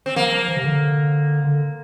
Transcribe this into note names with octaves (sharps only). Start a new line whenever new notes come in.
C4
F3 A#3
F3
E3
C3
D3
D3